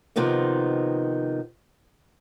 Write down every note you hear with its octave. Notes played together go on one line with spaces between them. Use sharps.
C3 D#3 F3 B3 D#4